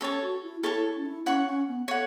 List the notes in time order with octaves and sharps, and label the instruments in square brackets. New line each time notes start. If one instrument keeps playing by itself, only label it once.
[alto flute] C#4 [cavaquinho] A4 C#5 A5
[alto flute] F#4
E4
[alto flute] E4 [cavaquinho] A4 C#5 A5
[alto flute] C#4
E4
[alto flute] C#4 [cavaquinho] C#5 F#5 C#6
[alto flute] C#4
B3
[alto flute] A4 [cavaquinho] C#5 F#5